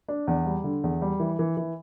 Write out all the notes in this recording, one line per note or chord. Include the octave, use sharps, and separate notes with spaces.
D4
E2
G3
D3
E2
G3
E3
E3
E3